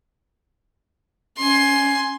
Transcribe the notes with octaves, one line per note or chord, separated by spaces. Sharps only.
C#4 G#5 C6